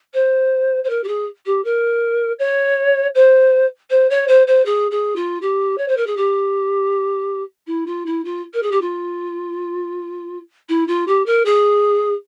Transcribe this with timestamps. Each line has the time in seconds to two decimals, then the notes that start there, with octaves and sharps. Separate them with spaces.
0.13 C5
0.83 C5
0.89 A#4
1.03 G4
1.07 G#4
1.45 G4
1.64 A#4
2.39 C#5
3.14 C5
3.90 C5
4.10 C#5
4.27 C5
4.47 C5
4.65 G#4
4.91 G#4
5.15 F4
5.41 G4
5.77 C#5
5.88 C5
5.96 A#4
6.06 G#4
6.16 G4
7.67 E4
7.86 F4
8.06 E4
8.24 F4
8.53 A#4
8.62 G#4
8.71 G4
8.81 F4
10.69 E4
10.87 F4
11.07 G4
11.25 A#4
11.45 G#4